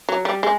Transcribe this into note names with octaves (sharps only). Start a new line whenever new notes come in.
F#3
G3
G#3